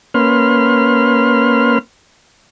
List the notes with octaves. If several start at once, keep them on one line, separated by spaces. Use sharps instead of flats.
A#3 C#4 B4 C6 F6